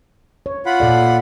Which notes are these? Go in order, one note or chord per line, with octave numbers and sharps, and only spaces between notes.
C#5
F4 F#5 B5
A#2 A4 D5